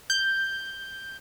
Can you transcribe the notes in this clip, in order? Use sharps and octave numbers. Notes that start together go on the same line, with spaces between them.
G6